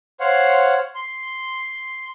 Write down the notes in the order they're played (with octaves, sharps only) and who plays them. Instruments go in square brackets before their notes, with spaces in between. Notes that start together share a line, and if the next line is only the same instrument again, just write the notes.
[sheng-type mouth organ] C5 C#5 F5 F#5
C6